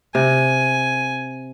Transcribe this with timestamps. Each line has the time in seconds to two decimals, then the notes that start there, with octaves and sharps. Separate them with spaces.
0.15 C3 G#5